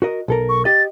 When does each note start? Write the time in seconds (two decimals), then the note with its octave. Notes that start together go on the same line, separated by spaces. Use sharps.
0.02 F#4 A#4 D#5
0.28 B1 A4 A#4
0.49 C#6
0.65 G4 D#5 A6